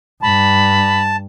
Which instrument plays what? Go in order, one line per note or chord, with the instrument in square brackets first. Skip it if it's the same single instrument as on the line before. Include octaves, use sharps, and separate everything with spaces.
[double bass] G2 [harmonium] A5 [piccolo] B5